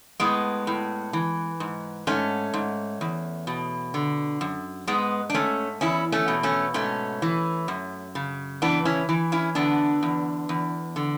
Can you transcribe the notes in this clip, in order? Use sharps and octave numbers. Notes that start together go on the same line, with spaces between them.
A2 G#3 B3
A2
E3
G#2
G#2 A3 C#4
G#2
E2
B2
D3
F#2
G#2 G#3 B3
D4
G#2 A3 C#4
E2 C#4 E4
A3 C#4
B2
A3 C#4
G#2 A3 C#4
E3
F#2
C#3
E3 B3 D4
C#4 E4
E3
C#4 E4
D3 B3 D4
E2
E2
D3